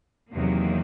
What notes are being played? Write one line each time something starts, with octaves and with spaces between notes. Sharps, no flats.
E2 C3 D#3 F#3 A#3